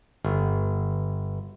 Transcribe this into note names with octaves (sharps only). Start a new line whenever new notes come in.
G1